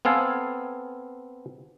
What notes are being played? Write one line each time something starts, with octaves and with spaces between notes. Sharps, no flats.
B3 C4 A4 F5 G#5